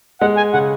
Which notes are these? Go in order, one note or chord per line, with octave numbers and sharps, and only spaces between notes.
G#3 F#5
G#5
C#3 F#5